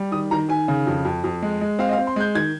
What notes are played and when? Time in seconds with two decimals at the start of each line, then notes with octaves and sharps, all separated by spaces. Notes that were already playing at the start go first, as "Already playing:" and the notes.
Already playing: G3
0.12 D#3 D#6
0.31 D#3 A#5
0.49 D#3 G#5
0.68 C#3
0.87 F2
1.05 F2
1.24 F2
1.42 G#3
1.61 G#3
1.79 C4 F5
1.89 D#5
1.93 F5
1.98 C4
2.07 C6
2.16 G#3 G6
2.35 D#3 G#6